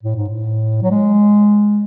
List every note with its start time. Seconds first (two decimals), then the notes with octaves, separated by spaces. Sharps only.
0.03 A2
0.16 G#2
0.30 A2
0.82 F#3
0.91 G#3